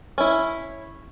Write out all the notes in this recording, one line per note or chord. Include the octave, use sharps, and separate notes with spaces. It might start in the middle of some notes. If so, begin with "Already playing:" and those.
C#4 E4